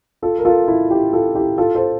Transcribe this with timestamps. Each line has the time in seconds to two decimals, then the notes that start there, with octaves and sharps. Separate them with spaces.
0.22 F4 A4
0.39 A#4
0.45 F4 A4
0.68 E4
0.90 E4 G4
1.13 F4 A4
1.35 E4 G4
1.58 F4 A4
1.75 A4 C5